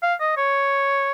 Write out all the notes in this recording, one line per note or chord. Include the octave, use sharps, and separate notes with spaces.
F5
D#5
C#5